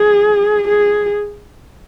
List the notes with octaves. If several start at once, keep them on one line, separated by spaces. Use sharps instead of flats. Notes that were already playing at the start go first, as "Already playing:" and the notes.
Already playing: G#4
G#4